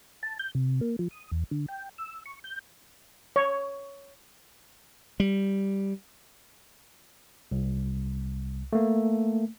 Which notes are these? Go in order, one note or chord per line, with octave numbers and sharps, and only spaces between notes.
A5
G6
C3
A#3
F3
D#6
E2
D3
G5
E6
C#6
G6
C#5
G3
C2
A3 A#3